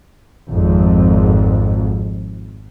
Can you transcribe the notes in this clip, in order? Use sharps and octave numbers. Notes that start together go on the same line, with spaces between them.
G#1 F2 G#2